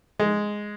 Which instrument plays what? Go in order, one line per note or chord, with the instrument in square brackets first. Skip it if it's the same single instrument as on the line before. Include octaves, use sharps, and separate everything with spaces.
[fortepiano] G#3